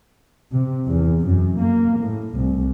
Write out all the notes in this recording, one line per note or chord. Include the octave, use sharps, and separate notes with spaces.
C3
E2
F#2
A#3
A2
C2